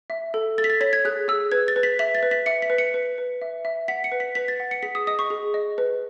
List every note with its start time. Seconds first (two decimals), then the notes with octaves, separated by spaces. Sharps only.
0.10 E5
0.34 A4
0.58 A4 A6
0.64 B6
0.70 A6
0.81 C#5 B6
0.93 G#6
1.05 G#4 F#6
1.28 G#4 E6
1.52 B4 G#6
1.68 A6
1.76 B4
1.83 B6
1.99 E5 B6
2.15 A6
2.23 B4
2.31 B6
2.46 E5 C#7
2.62 B6
2.70 B4
2.78 C#7
2.94 B4
3.18 B4
3.42 E5
3.65 E5
3.88 F#5 B6
4.04 C#7
4.12 B4
4.20 B6
4.35 B4 B6
4.48 A6
4.60 F#5
4.71 C#7
4.83 G#4 B6
4.95 D#6
5.07 D#5 D#6
5.19 C#6
5.30 G#4
5.54 D#5
5.78 B4